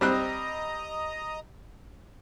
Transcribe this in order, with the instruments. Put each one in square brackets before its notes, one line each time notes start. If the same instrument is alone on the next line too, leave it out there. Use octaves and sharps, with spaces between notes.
[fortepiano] G3 C4 F#6 [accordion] D#5 A#5 D#6